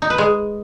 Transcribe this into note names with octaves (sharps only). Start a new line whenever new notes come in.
D#4
B4
G#3